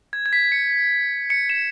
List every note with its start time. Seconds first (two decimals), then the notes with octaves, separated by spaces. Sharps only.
0.13 G#6
0.26 G#6
0.33 B6
0.52 C#7
1.30 C#7
1.50 E7